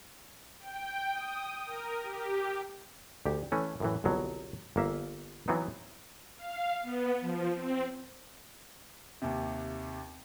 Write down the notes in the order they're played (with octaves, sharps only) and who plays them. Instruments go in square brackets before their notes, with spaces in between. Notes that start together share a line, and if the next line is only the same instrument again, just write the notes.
[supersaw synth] G5
D#6
A#4
G4
[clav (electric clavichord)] D2 G4
E3 A3 C#4
F#2 A2 E3
G1 C2 B2 F#3
G1 A#3 E5
E3 F#3 B3 C4 D#4
[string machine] F5
B3
F3
C4
[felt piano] D#2 C3